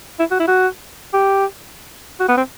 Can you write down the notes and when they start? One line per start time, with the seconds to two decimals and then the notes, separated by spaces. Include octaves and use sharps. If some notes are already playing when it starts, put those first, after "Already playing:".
0.19 E4
0.31 F#4
0.39 E4
0.48 F#4
1.13 G4
2.20 F#4
2.29 B3
2.37 C4